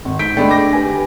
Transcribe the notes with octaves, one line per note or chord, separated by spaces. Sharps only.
G#1
G#2 G6 B6 D7
D3 G#3 A3 D5 G5 B5
D6 A#6
G4 B4 G#5